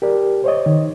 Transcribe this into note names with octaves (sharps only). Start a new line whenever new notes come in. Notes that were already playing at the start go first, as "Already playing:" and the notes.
G4 A#4 D5
C5 C#5 D#5
D#3